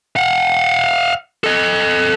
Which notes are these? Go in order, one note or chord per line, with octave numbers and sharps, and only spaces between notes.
F5 F#5
A4 D#5